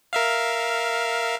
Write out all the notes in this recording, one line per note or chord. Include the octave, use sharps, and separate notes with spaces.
A#4 E5 F5